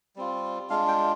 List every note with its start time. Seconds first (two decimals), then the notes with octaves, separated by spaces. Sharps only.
0.16 G3 C4 F4
0.70 G#3 D4 F4 F5
0.88 G5